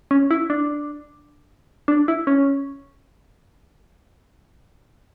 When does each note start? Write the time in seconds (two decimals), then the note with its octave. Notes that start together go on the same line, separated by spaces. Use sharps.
0.11 C#4
0.31 E4
0.50 D4
1.88 D4
2.08 E4
2.27 C#4